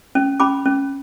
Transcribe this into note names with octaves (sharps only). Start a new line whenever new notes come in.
C#4
C#4 B5 D6
C#4